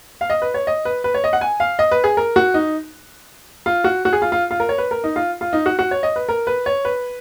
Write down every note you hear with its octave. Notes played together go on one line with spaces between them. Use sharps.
F5
D#5
B4
C#5
D#5
B4
B4
C#5
D#5
F#5
G#5
F5
D#5
B4
G#4
A#4
F#4
D#4
F4
F#4
F#4
G#4
F4
F4
F4
A#4
C#5
B4
A#4
D#4
F4
F4
D#4
F#4
F#4
C#5
D#5
B4
A#4
B4
C#5
B4